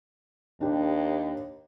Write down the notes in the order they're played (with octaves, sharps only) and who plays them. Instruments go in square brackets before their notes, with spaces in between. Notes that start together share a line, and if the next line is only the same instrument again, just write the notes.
[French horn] D#2 [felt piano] D4 G4